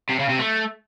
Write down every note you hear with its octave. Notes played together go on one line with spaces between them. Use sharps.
C3
C#3
C3
A3